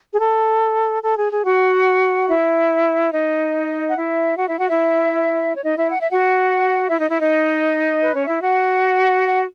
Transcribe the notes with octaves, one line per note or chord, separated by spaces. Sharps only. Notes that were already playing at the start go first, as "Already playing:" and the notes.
G#4
A4
A4
G#4
G#4
F#4 F#5
E4 E5
D#4 D#5
F#5
E4 E5
F#4 F#5
E4 E5
F#4 F#5
E4 E5
C#5
D#4 D#5
E4 E5
F#5
E5
F#4 F#5
E4 E5
D#4 D#5
E4 E5
D#4 D#5
B4
C#4 C#5
E4 E5
F#4 F#5
F#5